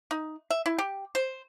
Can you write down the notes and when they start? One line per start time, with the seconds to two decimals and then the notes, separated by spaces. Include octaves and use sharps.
0.11 D#4
0.50 E5
0.66 E4
0.78 G4
1.15 C5